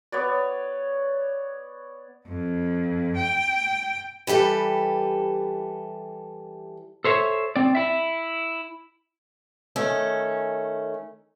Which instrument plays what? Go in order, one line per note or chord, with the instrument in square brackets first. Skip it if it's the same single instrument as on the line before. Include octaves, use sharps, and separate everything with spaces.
[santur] B3 C#5 D5
[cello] F2
G5
[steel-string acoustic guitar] E3 G3 G4 A4 B4
[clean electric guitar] A4 C5 C#5 E5
C4 D5
E4 E5
[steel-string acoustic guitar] D#3 A3 C#4